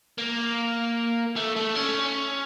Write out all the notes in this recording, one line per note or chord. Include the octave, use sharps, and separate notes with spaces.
A#3
A3
A3
C#4